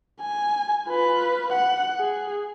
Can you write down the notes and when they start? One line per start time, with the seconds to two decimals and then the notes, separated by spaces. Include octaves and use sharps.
0.21 G#5
0.88 F4 B4
1.52 F#5
2.00 G#4